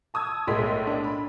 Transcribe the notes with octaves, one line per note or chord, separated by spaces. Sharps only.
A5 D#6 E6 G#6
B1 A2 G#3 A#4 C6 B6
D4
B5